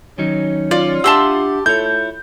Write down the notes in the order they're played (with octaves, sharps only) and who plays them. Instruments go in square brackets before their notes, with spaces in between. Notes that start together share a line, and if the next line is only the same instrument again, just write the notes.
[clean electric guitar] D#3 F#3 D#4 [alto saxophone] C#4
[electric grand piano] F4 [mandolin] D5
[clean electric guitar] D4 E5 F#5 [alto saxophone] G4 [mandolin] A5 C6 E6
[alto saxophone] A3 [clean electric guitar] E4 F4 C#5 [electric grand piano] G6